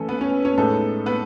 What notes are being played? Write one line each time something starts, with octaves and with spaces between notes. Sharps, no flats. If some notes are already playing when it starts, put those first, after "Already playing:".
Already playing: E3 A3 C#4 A4
B3 B4
C#4 C#5
C#4 C#5
A2 G#3 B3 D#4 A4
B3 B4